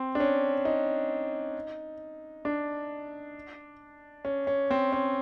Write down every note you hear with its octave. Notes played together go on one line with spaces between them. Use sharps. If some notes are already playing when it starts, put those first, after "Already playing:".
Already playing: C4
D4
C#4
D#4
D4
C#4
C#4
C4
C#4